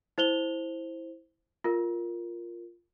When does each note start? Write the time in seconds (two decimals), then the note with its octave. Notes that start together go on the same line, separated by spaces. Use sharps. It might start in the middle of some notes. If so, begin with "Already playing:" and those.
0.18 E4 C5 F7 G7
1.64 F4 A#4